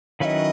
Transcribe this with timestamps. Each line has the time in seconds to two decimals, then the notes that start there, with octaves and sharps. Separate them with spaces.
0.20 D#3 F#3 C#4 E4 B4 D#5 F5